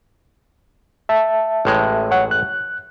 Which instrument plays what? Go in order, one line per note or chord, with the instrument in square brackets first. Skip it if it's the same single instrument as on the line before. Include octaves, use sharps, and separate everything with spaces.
[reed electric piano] E5 A5
[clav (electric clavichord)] A1 A2 G#3
[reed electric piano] C#5 F#5
F#6